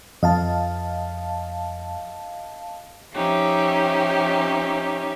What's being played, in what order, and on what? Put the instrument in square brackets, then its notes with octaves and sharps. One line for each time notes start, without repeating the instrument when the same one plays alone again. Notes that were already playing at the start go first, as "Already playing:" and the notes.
[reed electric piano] F2 [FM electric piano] D#5 F5 A5
[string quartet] F3 C#4 D#4 G4 E5